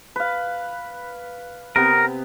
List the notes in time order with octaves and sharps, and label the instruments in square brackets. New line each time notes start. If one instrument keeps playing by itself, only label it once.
[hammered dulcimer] B4 F5
[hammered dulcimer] C3 B3 [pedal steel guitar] A#4